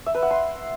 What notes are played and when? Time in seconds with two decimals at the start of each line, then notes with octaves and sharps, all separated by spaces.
0.06 E5
0.14 B4
0.23 F#5
0.31 C6